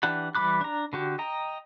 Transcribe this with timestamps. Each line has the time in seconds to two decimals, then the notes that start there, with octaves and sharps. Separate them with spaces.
0.03 E3 D4 G4 F#5
0.35 E3 G3 B5 D6 F#6
0.61 D4 A#5
0.93 D3 F#4 G4
1.19 D#5 G5 A#5